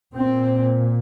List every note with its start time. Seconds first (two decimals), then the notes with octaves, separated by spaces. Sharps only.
0.15 A#2 C4